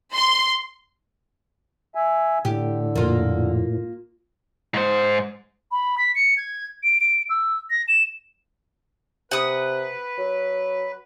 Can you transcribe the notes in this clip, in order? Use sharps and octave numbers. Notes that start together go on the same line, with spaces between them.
C6
E5 G#5
A2 D3 G4
F2 A#2 A#3 F4
G#2 C5
B5
B6
C#7
G#6
D7
D7
E6
A#6
E7
C3 B4 F#5 D#6
F#3